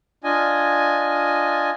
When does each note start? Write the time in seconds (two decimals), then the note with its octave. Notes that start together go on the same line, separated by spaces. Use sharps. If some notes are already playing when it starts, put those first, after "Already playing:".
0.24 D4 F4 D#5 G#5